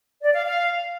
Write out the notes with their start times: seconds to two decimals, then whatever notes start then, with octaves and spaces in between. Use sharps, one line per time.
0.22 D5
0.34 F5
0.45 F5